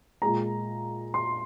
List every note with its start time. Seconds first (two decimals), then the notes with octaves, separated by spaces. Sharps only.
0.22 A#2 G#3 A#5
1.14 C6